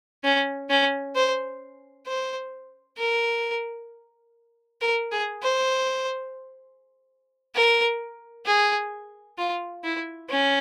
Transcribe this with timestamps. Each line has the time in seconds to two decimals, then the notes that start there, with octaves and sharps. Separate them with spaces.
0.24 C#4
0.70 C#4
1.16 C5
2.07 C5
2.98 A#4
4.81 A#4
5.12 G#4
5.42 C5
7.55 A#4
8.46 G#4
9.38 F4
9.84 E4
10.30 C#4